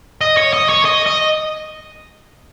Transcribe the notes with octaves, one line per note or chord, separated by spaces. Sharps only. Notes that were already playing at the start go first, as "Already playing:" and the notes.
D#5
C#5
D#5
C#5
D#5
D#5